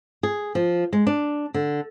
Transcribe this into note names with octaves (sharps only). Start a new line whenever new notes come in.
G#4
F3
G#3
D4
D3